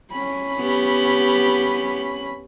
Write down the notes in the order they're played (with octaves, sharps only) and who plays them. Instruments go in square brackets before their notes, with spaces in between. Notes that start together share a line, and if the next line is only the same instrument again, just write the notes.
[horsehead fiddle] C#4 B5
[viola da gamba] B3 G4